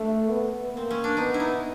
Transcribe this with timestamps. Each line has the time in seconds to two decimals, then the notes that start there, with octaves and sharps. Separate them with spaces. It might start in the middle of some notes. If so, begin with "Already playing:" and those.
Already playing: A3 D4
0.29 B3
0.73 A#3 C4
0.91 C#4
1.04 D4
1.17 B3 D#4
1.34 E4
1.40 D#4